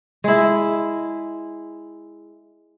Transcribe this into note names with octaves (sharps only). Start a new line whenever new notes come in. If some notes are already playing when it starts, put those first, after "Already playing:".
G#3 E4